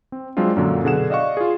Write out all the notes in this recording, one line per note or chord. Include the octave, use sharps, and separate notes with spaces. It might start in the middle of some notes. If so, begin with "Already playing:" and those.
C4
F#3 G#3 C4 D4 F4
F#2 A#2 D3 F#3
B2 D3 G#4 F#5 E7
D5 D#5 F5 F#5 C#6
F4 G#4